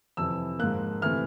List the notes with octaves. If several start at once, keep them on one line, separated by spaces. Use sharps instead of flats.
F2 C3 E3 E6
G#2 F3 A#3 F#6
C3 E3 A3 F6